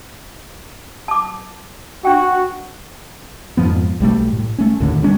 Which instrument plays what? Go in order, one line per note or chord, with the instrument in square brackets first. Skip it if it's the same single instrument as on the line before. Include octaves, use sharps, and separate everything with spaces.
[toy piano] A5 D6
[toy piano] D4 G5 [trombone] F#4
[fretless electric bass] F2 G#2 F3 B3
B1 G3 A3
A2
A3 C#4
D#2 A2 D3
G3 G#3 C#4 D4